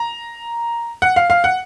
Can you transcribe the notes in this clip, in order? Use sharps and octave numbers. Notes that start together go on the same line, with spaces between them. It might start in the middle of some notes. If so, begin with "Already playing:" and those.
Already playing: A#5
F#5
F5
F5
F#5